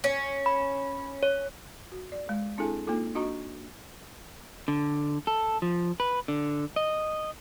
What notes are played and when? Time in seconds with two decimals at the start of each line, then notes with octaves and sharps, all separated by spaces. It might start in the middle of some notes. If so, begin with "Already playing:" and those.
0.04 C#4
0.46 B5
1.23 C#5
1.92 F#4
2.12 D5
2.29 G#3
2.58 C4 D4 E4 G#4 A4 G#5
2.87 A#3 D#4 F4 A4
3.15 D4 F#4 D#5 A#5 C#6
4.68 D3
5.27 A4
5.62 F3
6.00 B4
6.28 D3
6.76 D#5